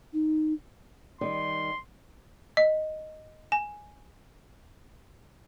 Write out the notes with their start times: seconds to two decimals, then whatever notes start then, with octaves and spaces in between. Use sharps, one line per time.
0.13 D#4
1.21 D#3 G3 C6
2.57 D#5
3.52 G#5